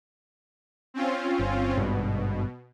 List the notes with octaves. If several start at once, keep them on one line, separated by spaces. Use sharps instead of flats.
C4 C#4 F4
G1
G#1 G2 B2